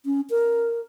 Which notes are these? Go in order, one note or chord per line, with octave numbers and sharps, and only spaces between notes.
C#4
A#4